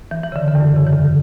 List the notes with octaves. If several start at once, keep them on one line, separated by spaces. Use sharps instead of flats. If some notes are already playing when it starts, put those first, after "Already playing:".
E3
E3
C#3
D3
D3
E2
F#2
C#3
E3
D3